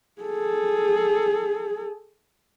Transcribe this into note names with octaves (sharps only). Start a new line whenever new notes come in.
G#4 A4